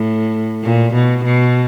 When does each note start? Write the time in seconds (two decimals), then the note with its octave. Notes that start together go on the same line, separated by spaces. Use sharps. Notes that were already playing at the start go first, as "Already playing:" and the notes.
Already playing: A2
0.64 A#2
0.94 B2
1.25 B2